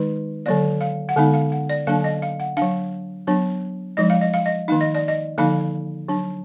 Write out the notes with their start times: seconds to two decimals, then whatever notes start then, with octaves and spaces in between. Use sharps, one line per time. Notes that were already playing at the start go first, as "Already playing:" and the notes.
Already playing: D#3 G#3 D#4 B4
0.46 D3 F#3 A#3 D5
0.81 F5
1.09 F#5
1.16 D3 G#3 B3 D#4 F5
1.33 F5
1.52 F#5
1.70 D5
1.87 D3 F#3 A#3 D4 F5
2.04 D#5
2.22 F5
2.40 F#5
2.57 F#3 D4 F5
3.27 F#3 B3 D4
3.97 F3 G#3 D#4 D#5
4.10 F5
4.21 D#5
4.34 F5
4.46 D#5
4.68 D#3 A#3 D#4 F5
4.81 D#5
4.94 D5
5.08 D#5
5.38 D3 F3 A#3 D#4 F5
6.08 F#3 D4